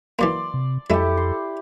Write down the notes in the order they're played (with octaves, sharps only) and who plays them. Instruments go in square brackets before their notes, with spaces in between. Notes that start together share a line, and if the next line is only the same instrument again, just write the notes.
[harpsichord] E3 F#3 A#3 [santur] D5 C6
[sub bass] C3
[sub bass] F2 [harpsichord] F#3 G#3 A3 [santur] E4 G4 [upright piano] A4
[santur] C6